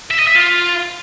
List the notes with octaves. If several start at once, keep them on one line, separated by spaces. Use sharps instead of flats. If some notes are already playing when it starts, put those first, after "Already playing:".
E5
D#5
E5
F4